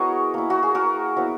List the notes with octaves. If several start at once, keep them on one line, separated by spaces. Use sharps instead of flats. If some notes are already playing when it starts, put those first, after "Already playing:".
Already playing: G#3 B3 E4 F#4 G#4 A#4 C#5 D#5
A#3 E4
F#4
G#4
F#4 A#4
F#3 B3 E4